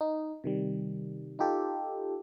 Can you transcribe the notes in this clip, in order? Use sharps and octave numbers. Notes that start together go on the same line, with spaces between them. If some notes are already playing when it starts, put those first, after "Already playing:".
D#4
C3 D#3 G3
D#4 F4 G4 A4